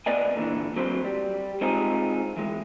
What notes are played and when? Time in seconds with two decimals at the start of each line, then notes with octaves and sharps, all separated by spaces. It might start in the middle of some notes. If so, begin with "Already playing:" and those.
0.06 B3 B4 D5 D#5 G#5
0.35 A#2 D3 E3
0.76 F#3 C4 B4 C5
1.05 G3
1.61 G#3 C4 D#4 F4 G#4
2.37 E3 G#3